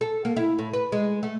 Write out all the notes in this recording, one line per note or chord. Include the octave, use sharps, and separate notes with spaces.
A4
A#3
E4
A2
B4
G#3
A3